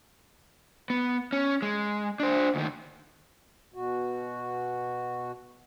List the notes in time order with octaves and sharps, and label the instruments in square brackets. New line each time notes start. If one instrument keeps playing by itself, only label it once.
[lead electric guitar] B3
C#4
G#3
D4 C5
D2 D#3
[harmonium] B2 F#4